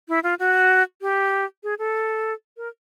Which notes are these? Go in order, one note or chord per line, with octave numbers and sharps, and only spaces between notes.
E4
F4
F#4
G4
G#4
A4
A#4